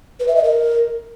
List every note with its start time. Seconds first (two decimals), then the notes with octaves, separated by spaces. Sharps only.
0.20 B4
0.28 E5
0.36 D#5
0.44 A#4